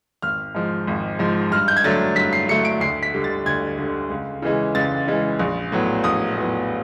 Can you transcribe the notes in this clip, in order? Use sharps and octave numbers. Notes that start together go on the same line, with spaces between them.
G#1 F6
G#2 F3
G#1
G#2 F3
G2 F6
G6
G#6
D3 F#3 A3 A6
G2 B6
C7
D3 F#3 A3 C#7
D7
D2 C7
B6
D3 G3
A6
D2 G#6
D3 G3
C#2
C#3 E3 G#3
C#2 A6
C#3 E3 G#3
A#1
A2 F#3 B3
A#1 D#6
A2 F#3 B3